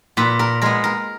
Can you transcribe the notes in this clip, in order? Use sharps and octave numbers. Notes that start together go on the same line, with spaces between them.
A#2 B4
A#4
G#3 B3 A#4
A#4